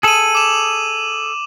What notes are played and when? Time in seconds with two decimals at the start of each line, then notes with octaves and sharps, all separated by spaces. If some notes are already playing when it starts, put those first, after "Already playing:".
0.03 G#4 A4 D#7 F#7
0.35 D6 E7